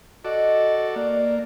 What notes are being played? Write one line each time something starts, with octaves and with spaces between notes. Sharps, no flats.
F#4 A4 D5 D#5
A#3 D5